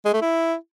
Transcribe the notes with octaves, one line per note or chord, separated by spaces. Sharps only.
G#3
A3
E4